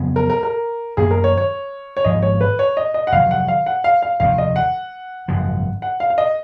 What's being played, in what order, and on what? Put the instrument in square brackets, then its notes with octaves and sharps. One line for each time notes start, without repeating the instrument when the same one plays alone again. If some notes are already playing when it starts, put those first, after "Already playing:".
Already playing: [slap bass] F2 C#3 F#3 B3
[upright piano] A#4
A#4
A#4
[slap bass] F#2 D#3 A#3 [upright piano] G#4
[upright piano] A#4
C#5
C#5
C#5
[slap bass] G#1 G#2 F3 G#3 [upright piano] D#5
[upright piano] C#5
B4
C#5
D#5
D#5
F#5
[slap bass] F1 F2 D#3 F#3 [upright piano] F5
[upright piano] F#5
F5
F#5
F5
F5
[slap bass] F1 D#2 D#3 [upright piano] F5
[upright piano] D#5
F#5
[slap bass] G#1 F#2 C#3 F3
[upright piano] F#5
F5
F5
D#5